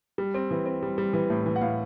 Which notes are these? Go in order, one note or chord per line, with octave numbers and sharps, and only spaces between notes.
G3
C4
E3
C4
G3
G3
E3
A2
E3
F#5
A2 F5